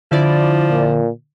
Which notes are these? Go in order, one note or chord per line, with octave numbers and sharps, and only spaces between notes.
D3 F3 E4 D5
A#2